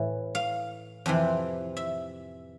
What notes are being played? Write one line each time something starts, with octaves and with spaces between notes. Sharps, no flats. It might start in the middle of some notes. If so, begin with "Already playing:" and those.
Already playing: A2 E3
F5
F2 C3 E3
E5